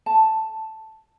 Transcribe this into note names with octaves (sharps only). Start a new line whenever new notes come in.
A5